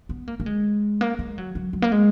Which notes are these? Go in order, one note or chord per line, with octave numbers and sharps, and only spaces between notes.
B3
A#3
A#3
G#3
A#3
G#3
F#3
F#3
F#3
A#3
G#3